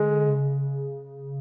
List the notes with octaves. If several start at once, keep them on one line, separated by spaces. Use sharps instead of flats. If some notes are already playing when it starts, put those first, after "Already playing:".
Already playing: D3 G#3
C#3